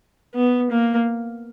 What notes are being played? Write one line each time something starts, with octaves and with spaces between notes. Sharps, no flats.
B3
A#3